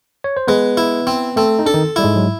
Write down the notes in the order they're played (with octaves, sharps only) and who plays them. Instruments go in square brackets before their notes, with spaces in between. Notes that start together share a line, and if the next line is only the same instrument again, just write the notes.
[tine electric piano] C#5
C5
[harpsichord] G#3 [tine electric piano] B3 B4
[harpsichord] E4
C4
[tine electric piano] A3 A4 [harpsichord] C4
[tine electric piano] D#4
[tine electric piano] D4 [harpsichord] A4
[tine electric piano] D#3 D#4
[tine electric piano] G3 [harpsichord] E4
[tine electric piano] G#2 G#3
F#3